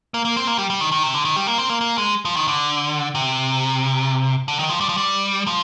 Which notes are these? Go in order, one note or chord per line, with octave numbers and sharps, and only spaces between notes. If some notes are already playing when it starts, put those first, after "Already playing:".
A#3
A#3
C4
A#3
G3
G3
D#3
D#3
C3
D3
D#3
G3
A#3
C4
A#3
A#3
G#3
F3
D#3
D3
C3
D3
D#3
F3
G3
F3
G3
F3